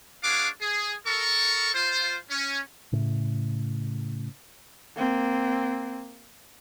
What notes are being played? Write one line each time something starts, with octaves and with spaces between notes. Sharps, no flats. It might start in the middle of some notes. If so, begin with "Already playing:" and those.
D4 G#4 C#5 F5 F#5 D6
G#4
A4 A#4 C#6
F4 C5
C#4
A2 C#3
A#3 C4